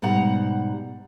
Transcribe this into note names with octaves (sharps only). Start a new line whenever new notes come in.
G#2 B2 G3 F#5 A#5